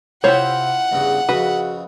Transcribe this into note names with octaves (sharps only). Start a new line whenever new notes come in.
C3 E4 F4 G4 C5 C#5 F#5
E2 G2 C#3
F2 C#3 F#4 B4